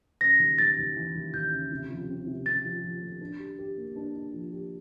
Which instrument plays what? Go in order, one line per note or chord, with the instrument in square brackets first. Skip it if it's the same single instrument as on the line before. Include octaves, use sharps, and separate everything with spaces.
[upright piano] C#3 [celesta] A#6
[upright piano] D#2
[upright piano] D#2 [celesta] A6
[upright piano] D#2
E3
D#2
[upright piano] D#2 [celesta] G6
[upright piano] C#3
C3
F3
C4
C3
[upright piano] C4 [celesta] A6
[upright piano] F3
F3
A3
D4
G4
G4
A#3
D4
D4
F3
G4